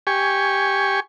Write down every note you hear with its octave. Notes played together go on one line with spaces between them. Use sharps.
G4 G#5 C#6